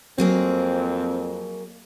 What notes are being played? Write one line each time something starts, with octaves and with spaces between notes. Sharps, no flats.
F2 F#3 A#3 C4 G#4